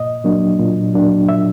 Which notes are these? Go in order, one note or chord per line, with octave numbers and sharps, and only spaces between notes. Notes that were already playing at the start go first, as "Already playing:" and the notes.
Already playing: A#2 D#5
F#3 A#3 D4
A#2
F#3 A#3 D4
A#2 E5